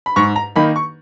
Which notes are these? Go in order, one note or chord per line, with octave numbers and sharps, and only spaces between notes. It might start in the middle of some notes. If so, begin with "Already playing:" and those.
B5
G#2 C#6
A#5
D#3 A#3 D#4 B5
C#6